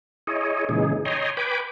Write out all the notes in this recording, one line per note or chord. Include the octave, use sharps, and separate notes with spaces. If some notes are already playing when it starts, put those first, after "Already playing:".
E4 G#4 C#5 D#5
A#2 C#3 E3 G#3 D#4 G#4
C#5 D#5 G5 G#5 A#5 C6
B4 G5 G#5 B5 D6